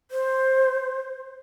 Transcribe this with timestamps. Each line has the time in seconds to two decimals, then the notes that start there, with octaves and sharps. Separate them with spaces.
0.11 C5